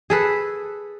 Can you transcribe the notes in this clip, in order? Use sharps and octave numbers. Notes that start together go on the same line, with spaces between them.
G#4 A4 B4